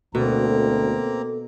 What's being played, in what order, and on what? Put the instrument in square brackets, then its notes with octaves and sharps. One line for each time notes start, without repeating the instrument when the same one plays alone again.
[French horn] D2 [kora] B2 [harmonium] A#3 C4 A#5 [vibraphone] A4